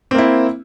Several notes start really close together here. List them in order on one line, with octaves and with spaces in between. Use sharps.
C4 A#3 E4